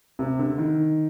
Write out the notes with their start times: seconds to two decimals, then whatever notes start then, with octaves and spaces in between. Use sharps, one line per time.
0.19 C3
0.39 D3
0.58 D#3